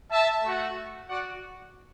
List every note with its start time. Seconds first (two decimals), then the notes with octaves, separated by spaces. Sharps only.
0.10 E5 A5
0.43 A3 F#4
1.09 F#4 D5 F#5